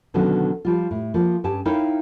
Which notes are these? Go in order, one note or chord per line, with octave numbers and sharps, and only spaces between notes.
B2 D3 D#3 F#3 B3 C#4
F3 G3 F4
A2
F3 A#3
G2 C#4 G4 G#5 A5
D#4 E4 A#4 C#5 F5 G5